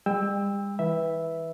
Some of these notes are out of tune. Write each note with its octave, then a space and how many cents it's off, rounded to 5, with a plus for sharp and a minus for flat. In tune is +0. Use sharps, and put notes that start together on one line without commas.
G3 +45 G5 +30 E6 -5
E3 -30 B4 -5 E5 -5